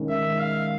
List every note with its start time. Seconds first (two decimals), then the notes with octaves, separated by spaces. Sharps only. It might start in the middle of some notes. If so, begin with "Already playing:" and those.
Already playing: D#3 G#3 C#4
0.09 E5
0.39 F5